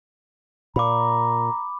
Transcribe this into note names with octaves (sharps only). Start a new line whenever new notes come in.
A#2 A#5 B5 D6